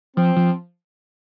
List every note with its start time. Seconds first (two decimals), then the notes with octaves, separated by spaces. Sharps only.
0.17 F3 C4
0.36 F3